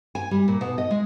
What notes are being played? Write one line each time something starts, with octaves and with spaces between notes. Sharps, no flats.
G#5
G3
A#2
B2
D#5
G#3